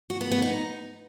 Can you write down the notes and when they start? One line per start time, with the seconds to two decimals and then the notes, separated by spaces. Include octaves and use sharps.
0.10 F#4
0.21 B3
0.31 B3
0.42 D#4